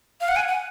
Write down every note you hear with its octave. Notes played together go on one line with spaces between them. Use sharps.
F5
F#5
G#5
F#5